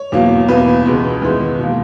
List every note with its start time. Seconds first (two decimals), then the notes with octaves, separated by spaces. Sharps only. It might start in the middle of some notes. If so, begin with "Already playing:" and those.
Already playing: C#5
0.12 E2 B2 F#3 A#3
0.48 E2 B2 A#3 B4
0.85 C#2 B2 G#3 B3
1.22 E2 D#3 G#3 B3
1.58 B2 A#3